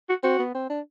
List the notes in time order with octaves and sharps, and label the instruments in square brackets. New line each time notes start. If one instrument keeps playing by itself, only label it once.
[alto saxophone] F#4
[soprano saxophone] C4 [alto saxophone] F#4
[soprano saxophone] B3
C4
D4